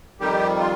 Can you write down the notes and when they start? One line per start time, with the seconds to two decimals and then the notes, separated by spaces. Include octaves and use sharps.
0.20 F2 D#3 G3 G4
0.59 F4